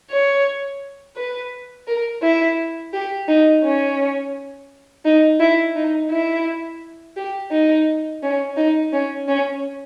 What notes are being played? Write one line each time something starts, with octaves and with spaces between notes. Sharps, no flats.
C#5
B4
A#4
E4
G4
D#4
C#4
D#4
E4
D#4
E4
G4
D#4
C#4
D#4
C#4
C#4